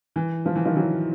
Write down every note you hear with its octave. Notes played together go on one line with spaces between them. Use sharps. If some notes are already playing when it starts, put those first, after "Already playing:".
E3
F3
E3
D#3 F3
E3 F#3